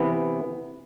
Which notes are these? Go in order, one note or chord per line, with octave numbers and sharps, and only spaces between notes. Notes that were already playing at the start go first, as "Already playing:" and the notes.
Already playing: C3 E3 B3